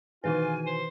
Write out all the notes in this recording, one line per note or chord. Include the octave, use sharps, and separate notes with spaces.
B2 D#3 E3 D#4 F4 G#4 B4 G#5
C5